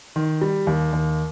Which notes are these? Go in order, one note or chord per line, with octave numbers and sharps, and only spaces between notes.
D#3
G3
D#2
D#2